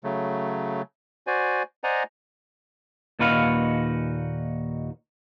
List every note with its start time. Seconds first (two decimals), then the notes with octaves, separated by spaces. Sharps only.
0.04 C#3 F#3 A3
1.27 F#4 C5 D5 G#5
1.84 C5 D5 D#5 F#5 G#5 A#5
3.19 D#2 A#2 D#4 F#4 B4 F5